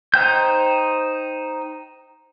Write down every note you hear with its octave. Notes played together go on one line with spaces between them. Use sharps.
D#4 C5 G5 G6